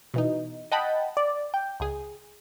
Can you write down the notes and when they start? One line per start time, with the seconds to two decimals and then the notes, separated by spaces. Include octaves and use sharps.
0.14 B2 E3 D#4
0.72 D#5 F#5 G5 A5 B5
1.17 D5
1.54 G5
1.80 C#2 G#4